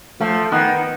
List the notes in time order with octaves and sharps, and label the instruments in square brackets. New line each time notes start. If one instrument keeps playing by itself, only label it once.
[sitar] F3 [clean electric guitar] A3
[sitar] D#3 [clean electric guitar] B3